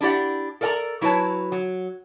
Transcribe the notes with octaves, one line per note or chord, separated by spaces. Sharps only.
D4 E4 G4 D5 F#5
A4 A#4 D5 G5 A#5
F#3 E4 F#4 B4 C#5 A5
F#3